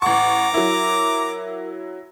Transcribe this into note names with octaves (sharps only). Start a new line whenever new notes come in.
A1 F#5 A#5 C#6 D6
F#3 E4 A#4